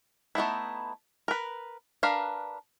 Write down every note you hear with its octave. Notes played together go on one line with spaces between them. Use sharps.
A3 B3 D#4 E4
A#4 B4
D4 A#4 B4 F5